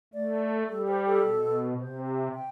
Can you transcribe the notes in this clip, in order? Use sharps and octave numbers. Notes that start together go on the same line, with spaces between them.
A3 D5
G3 A4
C5
A4
B2
C3 C5
E5
G5